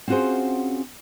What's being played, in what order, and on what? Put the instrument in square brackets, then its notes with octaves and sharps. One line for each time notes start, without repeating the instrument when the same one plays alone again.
[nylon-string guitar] C4 C#4 F4 F#4 G#4 C5